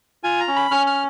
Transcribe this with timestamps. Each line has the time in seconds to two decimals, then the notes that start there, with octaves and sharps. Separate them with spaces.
0.24 F4 G#5
0.40 A#5
0.48 C#4
0.56 B5
0.71 C#4 F6
0.87 F6